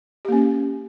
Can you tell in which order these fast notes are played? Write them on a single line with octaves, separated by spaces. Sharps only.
G4 A#3 C#4